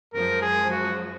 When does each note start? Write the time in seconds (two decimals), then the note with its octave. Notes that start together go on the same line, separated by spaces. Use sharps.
0.14 F#2 F3 G#3 A#4
0.42 G#4
0.71 F#4